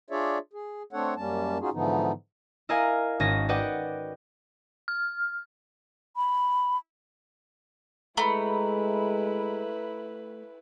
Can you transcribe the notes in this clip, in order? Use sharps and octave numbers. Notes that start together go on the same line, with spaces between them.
D4 F4 G#4 C#5 D5 E5
G#4
A3 C4 D4 A4 C#5 F#5
F#2 G3 A#3 C#4 A5
C#4 D#4 F4 F#4 G#4
G#2 D3 E3 F3 B3 D#4
E4 A#4 D#5 F5 G#5
G#1 C#4 D#5 A#6
F#4 B4 D5 D#5 F#5 G5
F6
B5
G#3 A3 E4 B4 A#5 B5